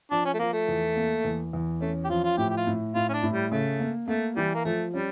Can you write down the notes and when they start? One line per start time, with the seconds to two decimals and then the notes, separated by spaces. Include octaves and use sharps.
0.11 F3 D4
0.25 C#4
0.34 A3
0.39 F3 A#3
0.53 A3
0.68 E2
0.96 A#3
1.24 E2
1.53 E2
1.81 A3 C#4
2.04 G4
2.10 F3 F4
2.24 F4
2.37 A2 G4
2.50 G4
2.57 F4
2.67 A2
2.95 A2 F4
3.09 C#4
3.13 D4
3.23 A2
3.33 G3
3.51 C#3 A3
3.80 A#3
4.08 A3 A#3
4.36 E3 G3
4.54 A#3
4.65 F3 A3
4.93 G3 C#4